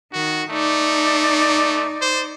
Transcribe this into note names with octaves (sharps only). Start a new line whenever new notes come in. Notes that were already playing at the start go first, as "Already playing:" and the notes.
D#3 F#4
A3 D#4 D5
C5